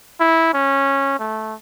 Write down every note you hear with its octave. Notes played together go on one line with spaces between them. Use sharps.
E4
C#4
A3